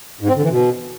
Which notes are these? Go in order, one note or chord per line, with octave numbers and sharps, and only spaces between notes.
G#2
C4
D3
E3
B2